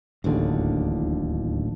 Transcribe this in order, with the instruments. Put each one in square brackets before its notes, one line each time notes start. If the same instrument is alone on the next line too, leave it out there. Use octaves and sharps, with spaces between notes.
[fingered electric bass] D1 A1 D#2 D3